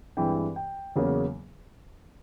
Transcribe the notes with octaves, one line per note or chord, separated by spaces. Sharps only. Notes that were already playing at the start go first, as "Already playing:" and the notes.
G2 E3 G#3 C4 G5
G5
E2 C#3 F#3 A#3 C#4